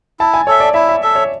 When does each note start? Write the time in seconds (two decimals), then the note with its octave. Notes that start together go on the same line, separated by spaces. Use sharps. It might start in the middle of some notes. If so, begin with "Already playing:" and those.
0.20 E4 A5
0.34 G#5
0.47 A4 C#5 E5
0.60 D5
0.74 E4 E5
0.89 E5
1.02 A4 E5
1.16 C#5